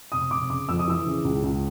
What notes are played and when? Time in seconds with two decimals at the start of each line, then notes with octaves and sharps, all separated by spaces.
0.12 F1 D#6
0.31 F1 D6
0.49 C#3 D6
0.68 F2 E6
0.79 D#6
0.87 E3 E6
1.06 C#3
1.25 C#2
1.43 C#2